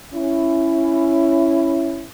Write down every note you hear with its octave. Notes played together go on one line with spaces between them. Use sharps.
C#4 E4